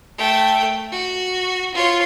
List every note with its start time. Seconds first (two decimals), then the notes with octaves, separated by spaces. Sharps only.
0.18 A3 G5
0.92 F#4
1.74 F4 C#5